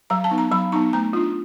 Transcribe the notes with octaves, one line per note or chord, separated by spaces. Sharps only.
F#3 A#5
A5
B3 D#4
A#5
F#3 B5
B3 D#4 A#5
A3 A#5
D4 F4